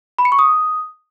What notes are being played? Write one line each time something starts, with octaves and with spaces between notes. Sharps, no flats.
B5
C#7
C#6
D#6